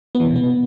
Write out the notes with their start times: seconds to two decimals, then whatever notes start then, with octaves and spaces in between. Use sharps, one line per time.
0.15 B3
0.20 E3
0.25 C3
0.30 B2
0.36 B3